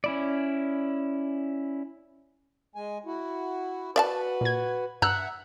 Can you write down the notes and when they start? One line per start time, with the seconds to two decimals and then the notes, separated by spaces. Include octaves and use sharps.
0.04 C#4 E4 D5
2.75 G#3 G#5
3.06 E4 F#4
3.96 F#4 B4 D5 E5 A5
4.41 A#2 G#6
5.02 G2 E5 F#5 A#5 E6 F#6